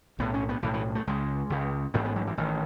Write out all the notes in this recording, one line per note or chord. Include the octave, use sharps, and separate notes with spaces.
B1 A2 B3
C#4
B3
B1 A2 E3
E3
A3
C#2 C#3 G#3
C#2 C#3
A1 G#2 B3
B3
F#3
E3
A1 D#3